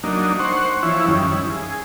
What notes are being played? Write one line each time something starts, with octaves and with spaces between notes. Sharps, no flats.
F#3 A#3 D4 D#4
C5 F#5 C#6
E3 F3 E4 C#5
F#2 D#3 G3 C#4
E4
G#4